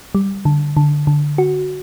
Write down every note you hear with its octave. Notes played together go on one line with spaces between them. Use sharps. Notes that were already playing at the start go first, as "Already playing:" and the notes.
G3
D3
D3
D3
F#4